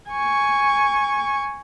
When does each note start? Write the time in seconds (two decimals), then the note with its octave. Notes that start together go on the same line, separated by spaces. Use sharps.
0.11 G#5 C#6